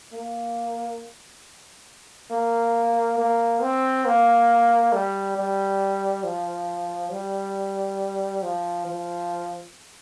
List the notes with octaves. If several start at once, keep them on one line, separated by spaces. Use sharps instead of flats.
A#3
A#3
A#3
C4
A#3
G3
G3
F3
G3
F3
F3